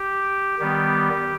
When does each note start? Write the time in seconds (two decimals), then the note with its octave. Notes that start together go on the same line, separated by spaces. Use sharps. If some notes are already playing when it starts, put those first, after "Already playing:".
Already playing: G4
0.59 D#3 G3 B3 G4